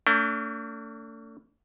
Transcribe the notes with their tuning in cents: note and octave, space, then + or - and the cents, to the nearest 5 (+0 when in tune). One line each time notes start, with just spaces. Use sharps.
A3 +35 D4 -40